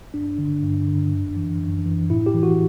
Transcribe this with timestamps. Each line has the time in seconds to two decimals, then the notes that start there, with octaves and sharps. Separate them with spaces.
0.14 G2 D4
0.38 D3
0.63 G2
0.87 D3
1.12 F#2
1.37 E3
1.61 F#2
1.86 E3
2.10 A2 E4
2.26 G4
2.34 E3
2.43 F#4